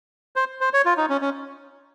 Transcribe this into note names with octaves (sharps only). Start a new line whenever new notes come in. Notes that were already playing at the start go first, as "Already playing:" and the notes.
C5
C5
C#5
F4
D#4
C#4
C#4